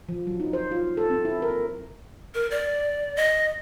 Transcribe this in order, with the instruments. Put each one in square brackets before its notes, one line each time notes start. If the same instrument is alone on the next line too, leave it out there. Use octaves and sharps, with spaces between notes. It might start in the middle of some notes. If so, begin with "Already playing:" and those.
[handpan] F3
F#3
D#4
C5
F4
A4
C4
E4
A#4
[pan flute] A#4
D5
D#5